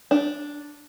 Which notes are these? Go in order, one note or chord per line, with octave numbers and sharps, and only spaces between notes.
D4